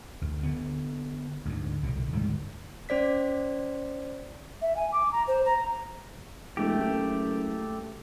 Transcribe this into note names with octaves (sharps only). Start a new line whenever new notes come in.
D2
D3 B3
D2 G#2
C2 B2 D3
D2 G#2 D#3 G3
C#4 C5 D5 B6
E5
G#5
D6
A#5
C5
A#5
E1 A3 G4
F#1